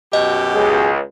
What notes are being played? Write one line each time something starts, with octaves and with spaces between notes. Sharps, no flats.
F#2 B2 G4 D#5
C#2 G#4